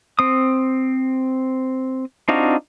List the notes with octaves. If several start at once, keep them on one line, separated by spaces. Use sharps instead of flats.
C4 D#6
C4 D4 D#4 F4 F#4